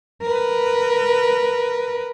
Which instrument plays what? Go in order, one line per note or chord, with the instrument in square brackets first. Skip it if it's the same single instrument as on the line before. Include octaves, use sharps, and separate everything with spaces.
[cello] A#4 B4